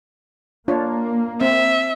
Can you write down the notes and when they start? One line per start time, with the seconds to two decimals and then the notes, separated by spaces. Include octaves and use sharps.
0.68 A#3 D4 F4 C#5
1.41 C4 E5